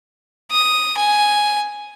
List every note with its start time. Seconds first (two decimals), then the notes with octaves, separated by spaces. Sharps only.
0.51 D#6
0.97 G#5